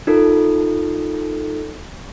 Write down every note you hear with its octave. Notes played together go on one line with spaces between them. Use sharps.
D#4 F4 A4 A#4